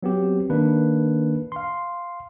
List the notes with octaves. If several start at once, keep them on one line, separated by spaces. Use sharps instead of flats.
F#3 B3 C4 G4
D#3 A#3 D4 B4
F5 C6